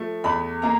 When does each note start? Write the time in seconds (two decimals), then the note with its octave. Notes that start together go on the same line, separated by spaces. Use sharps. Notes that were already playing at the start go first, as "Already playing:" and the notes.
Already playing: F3 A3
0.24 E2 B5
0.62 A#3 A#5